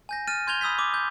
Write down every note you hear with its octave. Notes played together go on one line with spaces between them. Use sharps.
G#5 G6 A#6
F6 A6 D#7
C6 G6 G#6 F7 G7
B5 D#6 E6 G6 B6
D6
G6